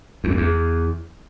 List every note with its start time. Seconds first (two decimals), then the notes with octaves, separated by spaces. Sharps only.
0.24 E2
0.30 F2
0.37 E2